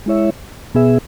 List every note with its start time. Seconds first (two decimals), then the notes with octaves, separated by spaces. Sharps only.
0.06 G#3 E4 C#5 E5
0.74 B2 B3 G#4 E5